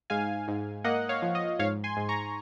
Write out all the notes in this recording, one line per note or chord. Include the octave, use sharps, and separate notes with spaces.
G#2 F5 G#5
G#2
A#3 D#5 F#5
C#5 F5
F3
D#5
G#2 C#5 F5
G#5 C6
G#2
A#5 C#6